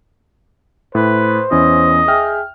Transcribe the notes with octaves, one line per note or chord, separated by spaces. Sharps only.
A2 B4 C5
E2 C#4 E4 D#5
G#4 E5 G5 F6